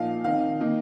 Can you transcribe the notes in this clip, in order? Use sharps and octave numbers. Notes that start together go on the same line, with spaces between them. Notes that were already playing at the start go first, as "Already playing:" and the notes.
Already playing: A#2 F3 D#4 F5
D#3 C4 D#4 F5
D#3 A#3 D#4